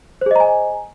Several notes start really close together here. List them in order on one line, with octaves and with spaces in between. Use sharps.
C5 G#4 D#5 A#5 G#5